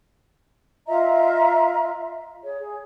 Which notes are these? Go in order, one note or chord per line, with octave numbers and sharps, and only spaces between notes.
F4 D#5 E5 A#5
G#4 C#5
G#4